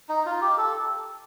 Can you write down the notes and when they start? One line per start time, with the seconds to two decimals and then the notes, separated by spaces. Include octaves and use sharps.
0.09 D#4
0.26 F4
0.41 G4
0.58 A4